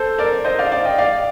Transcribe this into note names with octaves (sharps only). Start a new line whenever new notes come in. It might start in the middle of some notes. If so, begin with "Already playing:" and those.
Already playing: A4 C5
A#4 D5
C5 D#5
D5 F5
D5 F5
D#5 G5
D5 F5